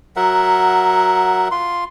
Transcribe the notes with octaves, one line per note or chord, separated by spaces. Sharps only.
F#3 A#4 E5 F#5
F4 C6